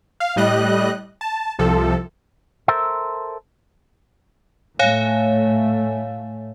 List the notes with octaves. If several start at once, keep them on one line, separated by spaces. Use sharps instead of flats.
F5
A2 G3 D#5 F#6
A5
C2 C3 F3 A4
A4 A#4 C5 E5
A2 A3 C#5 F5 G#5